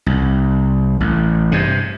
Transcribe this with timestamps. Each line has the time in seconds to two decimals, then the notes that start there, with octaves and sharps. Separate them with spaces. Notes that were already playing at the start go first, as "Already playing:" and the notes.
0.06 C2
1.00 A1
1.52 G2 C3